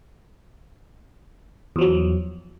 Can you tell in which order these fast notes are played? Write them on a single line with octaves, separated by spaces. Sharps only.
E2 F3 F#3